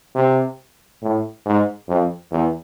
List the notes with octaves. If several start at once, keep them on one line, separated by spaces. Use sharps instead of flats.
C3
A2
G#2
F2
E2